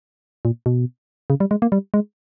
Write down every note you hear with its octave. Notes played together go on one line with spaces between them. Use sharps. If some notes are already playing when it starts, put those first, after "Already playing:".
A#2
B2
C#3
G3
G#3
A#3
G3
G#3